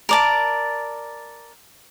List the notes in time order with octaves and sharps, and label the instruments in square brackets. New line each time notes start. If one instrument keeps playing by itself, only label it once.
[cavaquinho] A#4 D5 A5